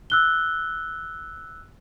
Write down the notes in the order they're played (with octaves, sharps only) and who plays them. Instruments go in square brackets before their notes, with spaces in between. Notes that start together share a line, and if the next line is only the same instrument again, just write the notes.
[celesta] E6 F#6 G7